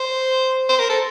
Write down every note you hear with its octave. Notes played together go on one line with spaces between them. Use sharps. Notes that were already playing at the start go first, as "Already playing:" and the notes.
Already playing: C5
C5
A#4
A4